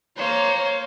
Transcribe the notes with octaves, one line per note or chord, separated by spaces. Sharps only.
A#3 C5 C#5